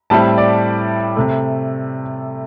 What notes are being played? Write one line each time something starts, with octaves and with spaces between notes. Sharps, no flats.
A2 G3 C4 E4 A5
D5
C3 A3